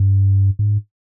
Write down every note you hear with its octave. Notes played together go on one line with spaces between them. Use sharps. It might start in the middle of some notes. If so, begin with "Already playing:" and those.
Already playing: G2
G#2